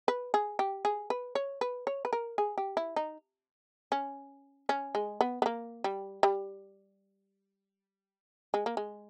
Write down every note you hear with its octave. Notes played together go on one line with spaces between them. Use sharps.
B4
G#4
G4
G#4
B4
C#5
B4
C#5
B4
A#4
G#4
G4
E4
D#4
C#4
C#4
G#3
B3
B3
A#3
G3
G3
G#3
A#3
G#3